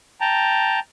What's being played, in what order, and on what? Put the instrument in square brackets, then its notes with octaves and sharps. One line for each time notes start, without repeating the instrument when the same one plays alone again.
[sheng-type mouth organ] G5 A5 A#5